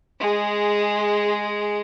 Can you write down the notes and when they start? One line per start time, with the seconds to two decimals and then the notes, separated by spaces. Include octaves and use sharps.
0.20 G#3 G#4